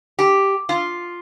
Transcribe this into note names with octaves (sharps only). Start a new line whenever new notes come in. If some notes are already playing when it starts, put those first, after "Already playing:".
G4
F4